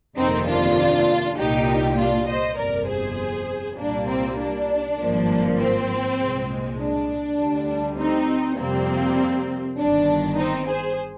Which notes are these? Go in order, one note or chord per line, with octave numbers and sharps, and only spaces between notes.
G1 F2 C3 D#3 A#3 C4 D#4
D4 F4
C2 A#2 G3 D#4 G4
D4 F4
C5 D#5
G1 F2 C3 A#4 D5
G#4 C5
C2 A#2 G3 A#3 D4
C4
D4
G#1 G2 F3 A#3
C4
C2 A#2 G#3
D4
D2 D3 G3
C4 D#4
F2 C3 G3 A#3 C4
G1 G2 D#3 D4
C4 D#4
G#4 C5